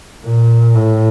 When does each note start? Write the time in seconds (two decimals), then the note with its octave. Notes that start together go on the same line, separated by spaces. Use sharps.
0.24 A#2
0.75 A2